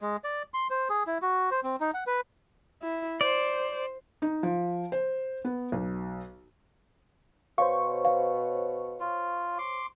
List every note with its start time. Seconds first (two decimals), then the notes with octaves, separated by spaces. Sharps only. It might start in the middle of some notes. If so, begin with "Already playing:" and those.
0.01 G#3
0.24 D5
0.54 C6
0.70 C5
0.89 G#4
1.07 E4
1.22 F#4
1.51 C5
1.63 C4
1.80 D#4
1.94 F#5
2.07 B4
2.82 E4
3.21 C5 D5
4.22 D#4
4.43 F3
4.92 C5
5.45 B3
5.72 B1
7.58 B2 C5 C#5 F5 C#6
8.05 F5
9.00 F4
9.59 C6 D6